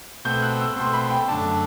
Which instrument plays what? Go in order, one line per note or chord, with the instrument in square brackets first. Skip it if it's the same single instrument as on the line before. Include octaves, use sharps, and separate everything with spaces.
[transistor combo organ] B2 A3 C4 [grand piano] G6
[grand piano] F#6
E6
[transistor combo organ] B2 A3 C4 [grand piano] C6
[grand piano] B5
G5
[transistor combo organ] F#2 D3 A3 D4 [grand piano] A5